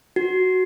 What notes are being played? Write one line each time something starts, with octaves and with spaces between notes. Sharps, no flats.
F#4